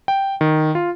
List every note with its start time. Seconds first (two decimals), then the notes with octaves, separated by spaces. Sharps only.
0.08 G5
0.41 D#3
0.75 F4